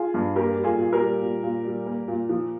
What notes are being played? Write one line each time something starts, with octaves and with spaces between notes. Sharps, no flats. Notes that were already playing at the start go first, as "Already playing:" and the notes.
Already playing: F4 G#4
G2
A#3 G4 A#4
G3
F4 G#4
A#2
G4 A#4
G3
A#2
A#2
G3
A#3
A#2
F3